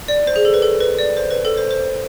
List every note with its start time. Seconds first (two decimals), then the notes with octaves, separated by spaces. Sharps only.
0.08 D5
0.27 C5
0.36 G#4
0.45 A4
0.54 B4
0.62 A4
0.80 B4
0.99 D5
1.17 C5
1.31 B4
1.45 A4
1.58 C5
1.71 C5